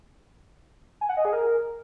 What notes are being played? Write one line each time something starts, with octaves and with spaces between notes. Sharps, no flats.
G#5
F#5
D#5
G#4
A#4